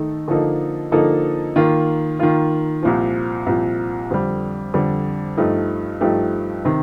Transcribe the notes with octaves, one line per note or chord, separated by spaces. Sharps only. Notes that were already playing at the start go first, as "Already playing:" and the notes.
Already playing: D#3 A3 D#4 A4
D3 F3 A#3 D#4 A4
D3 F3 A#3 D#4 A4
D#3 A#3 F4
D#3 A#3 F4
C2 A#2 F3
C2 A#2 F3
F2 D3 G3
F2 D3 G3
G2 F3 A3 D#4 G4
G2 F3 A3 D#4 G4
C3 D#3